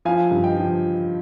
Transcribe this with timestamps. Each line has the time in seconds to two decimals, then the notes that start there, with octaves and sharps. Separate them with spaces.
0.05 F3 F5 G#5
0.31 G2
0.43 D#5 G5
0.57 F3